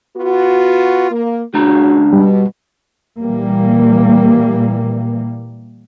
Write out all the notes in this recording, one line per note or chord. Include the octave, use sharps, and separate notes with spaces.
B3 F4 F#4
A#3
C#2 A#2 C#3 D4 F#4 A#5
B2 G3
A#2 E3 G3 A#3